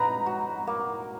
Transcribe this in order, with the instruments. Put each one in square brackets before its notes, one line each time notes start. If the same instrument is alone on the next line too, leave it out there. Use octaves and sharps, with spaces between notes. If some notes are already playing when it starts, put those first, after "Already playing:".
Already playing: [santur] D#4 B4 [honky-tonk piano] A#5
[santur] F#4
A#3